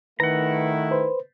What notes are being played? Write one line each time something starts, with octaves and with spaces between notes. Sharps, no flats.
D#3 A3 E4 B4 F#5 A#5
B4 C5